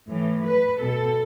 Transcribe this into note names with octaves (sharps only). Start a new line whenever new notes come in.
A2 E3
B4
B2 A4